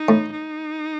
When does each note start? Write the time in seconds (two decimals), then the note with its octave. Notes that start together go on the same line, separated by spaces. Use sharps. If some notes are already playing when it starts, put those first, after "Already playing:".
Already playing: D#4
0.09 A2
0.32 D#4